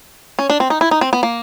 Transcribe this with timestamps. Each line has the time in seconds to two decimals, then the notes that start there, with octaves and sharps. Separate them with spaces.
0.39 C#4
0.50 D4
0.60 C4
0.70 D#4
0.81 E4
0.91 D#4
1.01 C4
1.13 B3
1.23 A#3